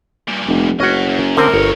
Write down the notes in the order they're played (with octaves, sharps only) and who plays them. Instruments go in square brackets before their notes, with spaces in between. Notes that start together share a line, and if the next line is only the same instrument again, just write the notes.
[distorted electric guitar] G2 A#2
[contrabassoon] F1
[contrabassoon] F#1 [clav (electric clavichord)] C#4 F#4 [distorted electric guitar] D#5 F#5
[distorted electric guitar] F#2
[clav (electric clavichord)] D3 C4 [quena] A#4
[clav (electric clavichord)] G1 [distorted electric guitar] G2 C#5